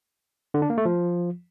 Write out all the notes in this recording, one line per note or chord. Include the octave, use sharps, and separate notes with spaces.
D3
D4
A#3
A3
F3